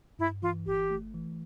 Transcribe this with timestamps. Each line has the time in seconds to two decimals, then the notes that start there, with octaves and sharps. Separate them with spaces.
0.19 G2 E4
0.42 E3 F4
0.66 G1 G4
0.90 A3
1.14 E3